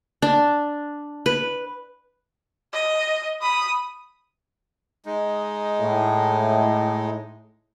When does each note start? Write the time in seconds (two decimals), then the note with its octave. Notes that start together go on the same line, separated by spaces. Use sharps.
0.22 D4
1.26 B4
2.73 D#5
3.42 B5 D#6
5.06 G#3 D#4
5.80 A2